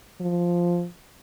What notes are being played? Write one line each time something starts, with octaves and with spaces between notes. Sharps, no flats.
F3